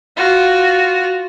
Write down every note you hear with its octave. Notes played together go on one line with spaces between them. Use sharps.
F4 F#4